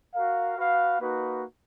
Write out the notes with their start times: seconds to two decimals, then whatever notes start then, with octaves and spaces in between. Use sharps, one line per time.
0.14 F#4 A#4 F5
0.58 F#4 B4 F5
1.00 A#3 D#4 F#4 B4